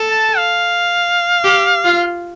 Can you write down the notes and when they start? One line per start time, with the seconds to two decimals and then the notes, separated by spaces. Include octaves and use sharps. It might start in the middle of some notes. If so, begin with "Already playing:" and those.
Already playing: A4
0.10 A5
0.37 F5
1.44 G4
1.85 F4